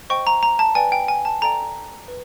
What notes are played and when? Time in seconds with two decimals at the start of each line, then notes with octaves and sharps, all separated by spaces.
0.10 C5 D#5 G5 C#6
0.27 A#5
0.43 A#5
0.59 A5
0.75 B4 D5 G5 G#5
0.92 G5
1.08 G#5
1.25 A5
1.42 A4 D5 G5 A#5
2.08 B4